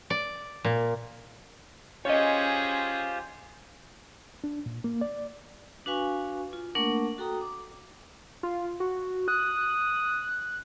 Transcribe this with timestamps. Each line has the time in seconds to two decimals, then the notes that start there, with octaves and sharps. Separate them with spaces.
0.10 D5
0.65 A#2
2.05 C#4 F4 G4 G#4 C5 C#5 D#5
4.44 D4
4.66 A#2
4.84 A#3
5.01 D5
5.86 D4 F#4 B4 F5 G#5 C#6
6.53 F4
6.75 A3 A#3 D4 A#4 F#5 C#6
7.18 F#4 A4 G5 A#5 D#6
7.41 D6
8.43 F4
8.80 F#4
9.28 D#6 F#6